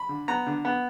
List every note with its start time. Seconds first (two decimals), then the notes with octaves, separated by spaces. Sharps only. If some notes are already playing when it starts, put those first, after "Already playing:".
Already playing: B5
0.09 D3
0.28 B3 A#5
0.47 D3
0.65 B3